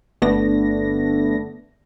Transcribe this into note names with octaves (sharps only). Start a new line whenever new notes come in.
G1 A3 B3 D4 A#6